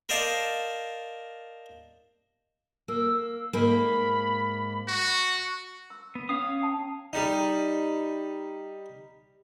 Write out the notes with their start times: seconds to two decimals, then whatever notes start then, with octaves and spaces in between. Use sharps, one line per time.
0.09 A#4 C5 D5 D#5 F5 A5
2.88 A#3 E6
3.53 G#2 A#3 B5
4.88 F#4 C#6
5.90 E6
6.15 B3
6.29 C#4 C#5 F5 D#6
6.62 G5 A5
7.13 G3 D#4